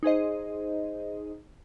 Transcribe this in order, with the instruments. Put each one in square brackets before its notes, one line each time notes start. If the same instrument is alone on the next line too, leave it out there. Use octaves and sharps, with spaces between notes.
[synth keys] D#4 G#4 C5 D#5